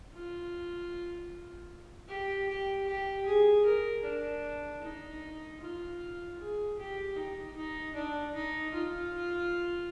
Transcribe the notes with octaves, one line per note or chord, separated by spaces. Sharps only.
F4
G4
G4
G4
G#4
A#4
D4
D#4
F4
G#4
G4
D#4
D#4
D4
D#4
F4